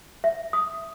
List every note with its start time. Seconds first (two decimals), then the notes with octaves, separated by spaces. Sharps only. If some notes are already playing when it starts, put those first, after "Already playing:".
0.24 E5
0.53 D#6